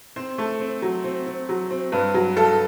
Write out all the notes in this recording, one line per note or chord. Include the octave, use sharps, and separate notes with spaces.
C4 C5
A3
C4
F#3
C4
C4
F#3
C4
G2 B4
F#3
G2 A4